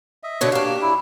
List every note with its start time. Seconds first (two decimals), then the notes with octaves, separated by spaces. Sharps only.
0.23 D#5 E5
0.41 B2 D3 C#5
0.52 D4 F#4 G4 F5
0.65 A#3
0.82 E4